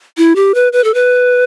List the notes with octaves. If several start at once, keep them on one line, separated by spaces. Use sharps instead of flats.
E4
G4
B4
B4
A4
B4